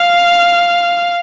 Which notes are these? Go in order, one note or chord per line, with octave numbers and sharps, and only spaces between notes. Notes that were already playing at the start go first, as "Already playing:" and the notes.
Already playing: F5